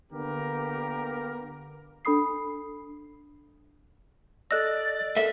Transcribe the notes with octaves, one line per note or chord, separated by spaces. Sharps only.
D3 A#3 B3 G4 A#4
D4 A4 B5 D#6 C7
A4 D5 D#5 E6 F#6 A#6
A4 A#4 E5